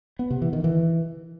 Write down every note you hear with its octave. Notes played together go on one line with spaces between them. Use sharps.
B3
C3
E3
D#3
E3